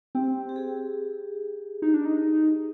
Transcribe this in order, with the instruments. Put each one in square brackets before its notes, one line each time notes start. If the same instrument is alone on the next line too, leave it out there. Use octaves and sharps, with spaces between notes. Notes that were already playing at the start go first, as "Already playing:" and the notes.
[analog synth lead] C4 [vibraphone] G4
[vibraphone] G4
G#4
[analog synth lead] D#4
D4
D#4